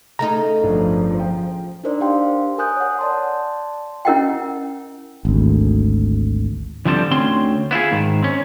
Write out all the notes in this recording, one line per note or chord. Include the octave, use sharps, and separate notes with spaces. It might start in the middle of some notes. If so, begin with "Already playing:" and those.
C#3 A3 D#4 A#5
G1 A2 F3 D4
G5
D4 D#4 A#4 C5 D5
D4 G4 F5 G5 C6
A#4 G#5 D#6 F#6 G6
C#5 F#5
D5 A5 C6
C#4 E4 A#4 D#5 F#5 G5
G#1 D2
D3 E3 F3 G3 C4 A4
D2 C4 C#4 C6
B3 E4 F4 G#4
G#2 D#3
C4 C#4